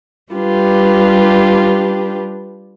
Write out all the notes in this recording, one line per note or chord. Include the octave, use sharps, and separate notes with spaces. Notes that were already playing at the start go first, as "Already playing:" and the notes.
G3 D4 F4 G4 B4